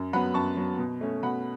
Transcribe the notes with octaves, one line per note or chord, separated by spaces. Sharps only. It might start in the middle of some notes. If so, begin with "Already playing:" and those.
Already playing: F#2
F#3 B3 F#5 B5
F#2 A5 C#6
F#3 B3
B2
A3 C#4
B2 F#5 B5